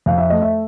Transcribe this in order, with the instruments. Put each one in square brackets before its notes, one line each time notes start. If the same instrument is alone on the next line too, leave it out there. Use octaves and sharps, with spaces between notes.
[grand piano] F2 [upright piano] F5
[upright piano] E5
[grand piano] A3 [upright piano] D#5
[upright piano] E5